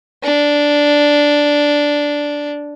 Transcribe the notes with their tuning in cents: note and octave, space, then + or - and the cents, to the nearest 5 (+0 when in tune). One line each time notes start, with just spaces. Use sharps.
D4 -5